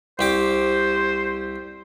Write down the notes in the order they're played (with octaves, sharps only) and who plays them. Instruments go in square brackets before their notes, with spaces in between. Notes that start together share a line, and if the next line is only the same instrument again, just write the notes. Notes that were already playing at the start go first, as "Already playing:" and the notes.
[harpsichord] C2 G4 D6 [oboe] C5